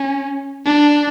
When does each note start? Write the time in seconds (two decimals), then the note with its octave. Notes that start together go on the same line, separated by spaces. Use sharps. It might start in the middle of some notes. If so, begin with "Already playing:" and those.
Already playing: C#4
0.65 D4